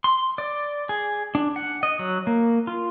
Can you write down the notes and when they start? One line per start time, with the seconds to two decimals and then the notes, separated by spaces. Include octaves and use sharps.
0.04 C6
0.38 D5
0.89 G#4
1.35 D4
1.56 F#5
1.83 D#5
1.99 F#3
2.27 A#3
2.67 F4